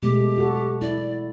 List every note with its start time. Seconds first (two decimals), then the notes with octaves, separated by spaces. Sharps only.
0.03 B2 G#3 A3 G4
0.38 F#4 A4
0.82 E4 D5